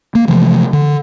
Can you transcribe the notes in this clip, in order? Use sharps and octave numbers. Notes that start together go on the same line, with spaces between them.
A#3
C3 E3 F3 A3
D3